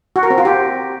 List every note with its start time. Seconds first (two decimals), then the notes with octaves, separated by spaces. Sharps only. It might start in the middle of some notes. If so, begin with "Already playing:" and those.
0.16 F#4
0.23 A#4
0.30 C4
0.38 F4
0.45 G4